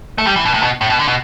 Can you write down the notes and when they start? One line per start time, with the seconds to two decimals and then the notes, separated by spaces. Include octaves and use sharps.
0.18 A3
0.27 G3
0.36 E3
0.45 B2
0.54 A2
0.63 B2
0.81 A2
0.90 B2
0.99 D3
1.08 B2